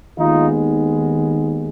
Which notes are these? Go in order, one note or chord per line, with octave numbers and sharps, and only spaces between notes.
D#2 D#3 G#3 B3 D#4 F4